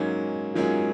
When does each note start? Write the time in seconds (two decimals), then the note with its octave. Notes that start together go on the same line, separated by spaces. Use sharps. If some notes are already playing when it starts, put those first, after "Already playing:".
Already playing: G#2 F#3 A#3 C#4 D#4 G#4
0.55 G#2 F#3 A#3 C#4 F4 G#4